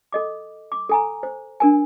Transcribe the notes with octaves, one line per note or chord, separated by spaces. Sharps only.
A4 D#5 D6
D6
A4 G#5 A#5
C5
D4 A#4 G#5